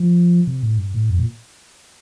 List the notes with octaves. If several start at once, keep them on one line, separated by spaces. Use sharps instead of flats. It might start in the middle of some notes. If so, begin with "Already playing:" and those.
Already playing: F3
C3
A2
G2
A2
F2
A#2